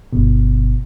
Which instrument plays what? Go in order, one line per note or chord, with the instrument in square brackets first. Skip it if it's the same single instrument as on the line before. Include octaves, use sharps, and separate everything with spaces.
[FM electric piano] G1 B2